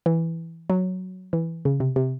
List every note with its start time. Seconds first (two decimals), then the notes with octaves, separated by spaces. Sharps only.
0.06 E3
0.70 F#3
1.33 E3
1.65 C#3
1.80 C3
1.96 C3